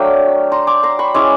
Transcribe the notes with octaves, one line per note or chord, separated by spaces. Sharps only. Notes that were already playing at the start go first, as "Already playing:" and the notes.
Already playing: F#3 A3 D4 F5 G5
A#5 C6
C6 D6
A#5 C6
B5 C#6
G#3 C#4 E4 C6 D6